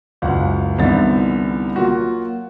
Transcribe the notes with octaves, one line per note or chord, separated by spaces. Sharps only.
F#1 C#2 F#2 F5 F#5
C2 D3 E3 B3 D#4 A6
F#3 A#3 F4 F#4